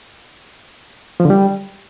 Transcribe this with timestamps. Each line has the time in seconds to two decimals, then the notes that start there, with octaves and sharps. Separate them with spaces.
1.20 F3
1.25 D3
1.30 G3